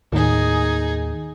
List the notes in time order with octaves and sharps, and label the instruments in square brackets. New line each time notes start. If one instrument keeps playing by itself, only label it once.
[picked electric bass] D#2 D#3 [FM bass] A2 [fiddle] D#4 G#4